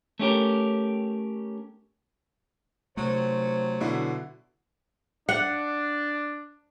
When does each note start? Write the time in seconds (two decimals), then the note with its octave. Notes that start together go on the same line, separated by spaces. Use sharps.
0.19 A3 C#4 G4 A#4
2.97 C3 F#3 A3 C5
3.80 B2 D3 E4
5.29 D4 F#5